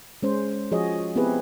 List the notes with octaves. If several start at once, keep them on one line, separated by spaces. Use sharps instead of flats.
G#3 C#4 C5
F3 F#4 G#4 C#5 D#5
B3 C4 E4 G4 G#4 B4